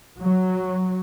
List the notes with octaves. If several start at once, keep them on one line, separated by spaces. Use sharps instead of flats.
F#3